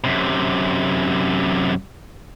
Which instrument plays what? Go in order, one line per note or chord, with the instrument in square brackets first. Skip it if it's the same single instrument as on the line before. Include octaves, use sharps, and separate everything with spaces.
[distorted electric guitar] F#2 C3